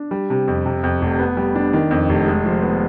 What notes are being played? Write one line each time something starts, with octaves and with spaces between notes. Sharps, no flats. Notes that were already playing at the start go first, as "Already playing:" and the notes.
Already playing: D4
G3
C3
F2
C3
F2
F1
B3
G3
D4
D#3
F2
F1
G#3
F3
B3